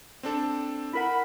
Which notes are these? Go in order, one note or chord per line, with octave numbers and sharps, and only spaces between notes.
C4 D4 A4
E4 A#4 F#5 B5